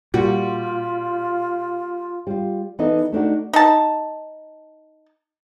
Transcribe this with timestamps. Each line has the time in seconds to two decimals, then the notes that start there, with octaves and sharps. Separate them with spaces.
0.14 A#2 G3 F4 F#4
2.27 G3 F4
2.79 E3 B3 D4 D#4 A4 D#5
3.12 A3 D4 D#4 F#4
3.53 D#4 A5